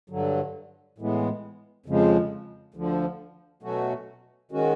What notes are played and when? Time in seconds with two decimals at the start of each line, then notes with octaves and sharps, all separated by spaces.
0.10 G2 D3 F#3
0.98 A2 E3 G#3 B3
1.86 F2 C#3 F3 G#3
2.74 D2 D3 F3
3.63 B2 F#3 A3 C#4 F#4
4.52 D#3 G#3 C#4 F#4